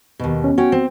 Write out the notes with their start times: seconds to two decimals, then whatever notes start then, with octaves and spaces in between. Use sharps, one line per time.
0.19 D#2 B2
0.44 C#4
0.58 C#4 F#4 G5
0.72 C4